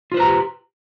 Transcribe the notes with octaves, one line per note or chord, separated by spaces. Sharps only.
F4 G4 B4 C5 A#5